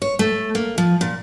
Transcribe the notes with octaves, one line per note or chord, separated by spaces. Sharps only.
C#5
A3
A#3
F3
A#2